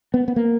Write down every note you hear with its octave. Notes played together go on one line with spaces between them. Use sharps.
B3
B3
A#3